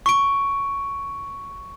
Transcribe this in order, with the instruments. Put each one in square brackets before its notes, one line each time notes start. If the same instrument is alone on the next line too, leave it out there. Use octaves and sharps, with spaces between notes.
[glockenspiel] C#6 D7